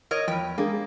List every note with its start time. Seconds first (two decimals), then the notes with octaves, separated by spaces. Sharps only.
0.11 A#4 C#5 D#5
0.28 E2 F3 G5 B5
0.58 G#3 A#3 D4 G#4